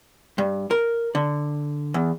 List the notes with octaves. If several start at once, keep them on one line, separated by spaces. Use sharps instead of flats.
G2
A#4
D3
E2